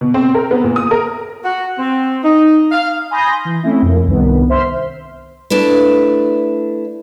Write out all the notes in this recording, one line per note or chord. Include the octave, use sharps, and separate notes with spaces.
B2
C4
A#4
B3
A#2
D#6
A#4
F#4
C4
D#4
F5
G#5 B5 C6 D#6 G6 A#6
E3
A3 C4 C#4 E4
F2 B2 A#3
C2 G2 D#3 B3
C5 E5 C6 F6
A3 D4 E4 B4